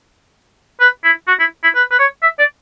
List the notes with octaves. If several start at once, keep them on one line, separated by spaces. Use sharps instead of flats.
B4
E4
F#4
E4
E4
B4
B4
C#5
E5
D5